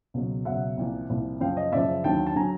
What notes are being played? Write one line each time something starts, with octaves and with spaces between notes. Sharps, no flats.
C#2 B2 F#3
C#2 B2 F#3 E5 F#5
C2 A#2 F3
C2 A#2 F3
F#2 C#3 F3 F5 G5
D#5 F5
F#2 C#3 F3 D5 E5
D#2 D3 F#3 G5 A5
A5
D3 F#3 G#5 A#5